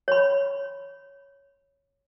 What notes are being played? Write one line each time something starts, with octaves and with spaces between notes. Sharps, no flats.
C#5 B5